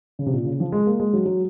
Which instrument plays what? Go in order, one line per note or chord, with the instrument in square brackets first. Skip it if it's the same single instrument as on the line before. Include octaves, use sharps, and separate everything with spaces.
[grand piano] C#3
C3
A#2
C#3
F3
G#3
A#3
G#3
F#3
F#3